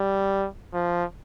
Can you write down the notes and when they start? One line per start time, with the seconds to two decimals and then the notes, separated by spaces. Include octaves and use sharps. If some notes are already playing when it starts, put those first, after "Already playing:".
Already playing: G3
0.74 F3